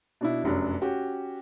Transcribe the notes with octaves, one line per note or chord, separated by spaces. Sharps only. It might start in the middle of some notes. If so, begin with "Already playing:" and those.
B2 D4 E4
F1 F#2 F#3 D4
C#4 F#4 G4